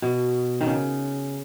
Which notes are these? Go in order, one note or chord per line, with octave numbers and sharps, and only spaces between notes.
B2
D#3
C#3